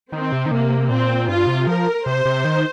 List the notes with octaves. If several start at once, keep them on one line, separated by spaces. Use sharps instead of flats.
D#3 C4
C3
D#3
C3 A#3
A#2 C4
G2 F4
C3
F3 A#4
C3 C5
C3
D#3